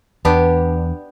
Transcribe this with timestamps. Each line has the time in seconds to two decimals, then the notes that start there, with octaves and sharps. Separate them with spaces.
0.25 E2 B3 D4 G4